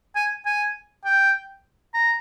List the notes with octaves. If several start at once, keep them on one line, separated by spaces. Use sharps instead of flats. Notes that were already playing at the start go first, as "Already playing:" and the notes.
G#5
G#5
G5
A#5